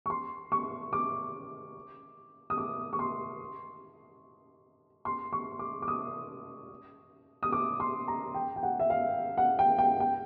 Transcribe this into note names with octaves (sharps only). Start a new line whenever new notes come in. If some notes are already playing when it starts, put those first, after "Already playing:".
C#6
C6
C#6
D6
D#6
D6
C#6
C6
C6
C#6
D6
D6
D#6
D#6
D6
C6
A#5
G5
G5
F#5
E5
F5
F#5
G5
G5
G5